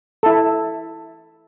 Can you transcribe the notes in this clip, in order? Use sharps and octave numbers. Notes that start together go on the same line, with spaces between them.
E4 A4